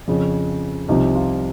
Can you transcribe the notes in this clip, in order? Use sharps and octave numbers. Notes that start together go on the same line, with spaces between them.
F2 C#3 F3
C2 C3 F3 D#4
F4